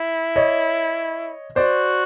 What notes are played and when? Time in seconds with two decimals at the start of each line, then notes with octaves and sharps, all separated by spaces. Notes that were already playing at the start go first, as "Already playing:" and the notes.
Already playing: E4
0.36 C#5 D#5
1.56 F#4 C5 D5